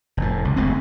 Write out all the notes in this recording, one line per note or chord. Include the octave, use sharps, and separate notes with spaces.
F1 A2
C#2
F1 D2 G#2 C4